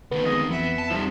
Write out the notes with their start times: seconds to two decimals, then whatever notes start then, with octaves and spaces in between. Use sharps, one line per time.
0.11 D2 D#3 B3
0.23 F2 G#3 D#5
0.51 F2 E3 B3 E5
0.78 A5
0.91 C3 F3 G3 D#4